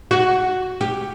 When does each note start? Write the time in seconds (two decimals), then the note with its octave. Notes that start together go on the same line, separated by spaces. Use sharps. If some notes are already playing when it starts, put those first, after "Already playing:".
0.11 F#4
0.81 G4